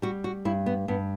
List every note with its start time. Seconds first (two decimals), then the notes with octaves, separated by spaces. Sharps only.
0.02 G3 F#4
0.24 F#4
0.45 G2 E4
0.66 B3
0.88 G2 B3